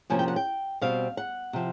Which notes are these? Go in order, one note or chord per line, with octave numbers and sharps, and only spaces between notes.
C3 F3 A#3 C#4 G#5
G5
F#5
G5
B2 G3 C4 F5
F#5
C3 F3